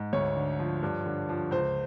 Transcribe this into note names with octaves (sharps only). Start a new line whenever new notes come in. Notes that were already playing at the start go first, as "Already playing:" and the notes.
Already playing: G#2
D2 C#5
D3
F3
G2
D3
F3
C#2 C5